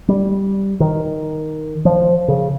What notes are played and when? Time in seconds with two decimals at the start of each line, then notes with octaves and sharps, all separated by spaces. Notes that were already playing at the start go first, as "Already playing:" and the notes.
0.08 G3
0.80 D#3
1.85 F3
2.28 C#3